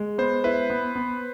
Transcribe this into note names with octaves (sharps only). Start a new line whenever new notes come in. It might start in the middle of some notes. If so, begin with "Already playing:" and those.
Already playing: G#3
B3 C5
E4 B4
B3
B3